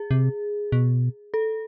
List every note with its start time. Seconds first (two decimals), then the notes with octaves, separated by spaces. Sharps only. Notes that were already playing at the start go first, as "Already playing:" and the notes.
Already playing: G#4
0.11 C3
0.72 B2
1.34 A4